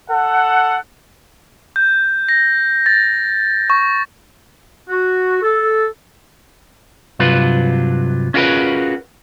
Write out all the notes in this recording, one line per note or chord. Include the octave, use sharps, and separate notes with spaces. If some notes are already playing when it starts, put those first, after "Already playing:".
A4 F#5
G6
A#6
A6
C#6
F#4
A4
G2 C3 F#3 F4 B4
C#4 F4 F#4 G#4 A#4 B4